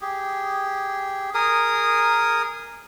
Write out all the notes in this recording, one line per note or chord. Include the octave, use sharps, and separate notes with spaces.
G4 G#4
G#4 A#4 D#6